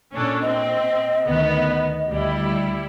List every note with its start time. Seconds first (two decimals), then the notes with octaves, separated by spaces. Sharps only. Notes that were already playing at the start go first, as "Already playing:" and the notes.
0.13 A#2 C#4 D4 A4
0.42 C4 D#5
1.26 D2 D#3 B3
2.11 D2 G3 E4